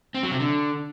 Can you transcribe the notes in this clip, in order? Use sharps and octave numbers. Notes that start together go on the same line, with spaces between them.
C4
F#3
C3
D3